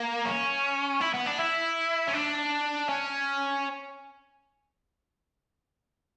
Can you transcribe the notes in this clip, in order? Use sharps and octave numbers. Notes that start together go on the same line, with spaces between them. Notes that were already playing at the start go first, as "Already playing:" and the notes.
Already playing: A#3
C#4
E4
B3
D4
E4
C#4
D4
C#4